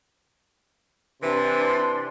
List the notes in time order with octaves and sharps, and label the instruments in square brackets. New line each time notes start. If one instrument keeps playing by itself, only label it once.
[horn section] C3 E3 [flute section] D4 C6